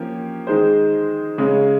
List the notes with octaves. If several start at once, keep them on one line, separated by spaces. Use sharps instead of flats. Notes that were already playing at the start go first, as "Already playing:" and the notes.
Already playing: F3 A#3 C#4 G4
D#3 G#3 D#4 G#4 C5
C#3 G#3 C#4